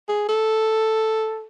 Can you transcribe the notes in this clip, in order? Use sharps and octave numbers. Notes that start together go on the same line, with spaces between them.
G#4
A4